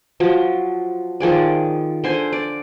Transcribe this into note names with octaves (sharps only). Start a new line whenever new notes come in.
F3 F#3
D#3 F3 G#4 D5
D3 C5 G#5
D5